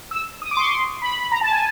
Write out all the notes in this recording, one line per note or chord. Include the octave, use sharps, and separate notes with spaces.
E6
D#6
D6
C6
C#6
C6
B5
B5
A#5
A5
G#5